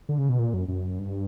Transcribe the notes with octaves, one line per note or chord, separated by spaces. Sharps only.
D3
C#3
B2
A#2
F#2
F#2
G2